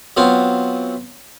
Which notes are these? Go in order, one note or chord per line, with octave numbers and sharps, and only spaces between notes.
F#3 B3 C4 F4